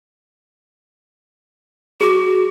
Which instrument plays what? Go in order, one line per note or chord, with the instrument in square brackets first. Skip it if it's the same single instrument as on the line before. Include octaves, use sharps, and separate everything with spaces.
[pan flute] F#4 [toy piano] G#4 D6